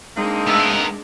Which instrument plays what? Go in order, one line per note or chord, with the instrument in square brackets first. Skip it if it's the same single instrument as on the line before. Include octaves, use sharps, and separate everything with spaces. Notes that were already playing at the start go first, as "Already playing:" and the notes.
[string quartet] G#3 D4 [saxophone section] A#3 C4 D#4
[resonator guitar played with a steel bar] A3 E5 [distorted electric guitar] B3 A#4